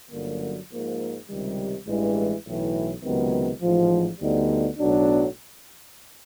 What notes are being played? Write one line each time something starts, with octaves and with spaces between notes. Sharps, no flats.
G1 F#2 D3 F#3 A#3
G#2 F3 A#3
C#2 C3 D#3 G3
A1 G2 E3 G#3
B1 A2 E3
C#2 C3 D#3 F#3 B3
A1 G#2 F3
D2 D3 G3 B3 D#4
B1 A2 F#3 B3 D4